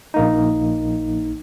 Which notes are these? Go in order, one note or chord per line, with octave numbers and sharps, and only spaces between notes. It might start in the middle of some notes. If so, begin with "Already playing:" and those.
A#1 A#3 D#4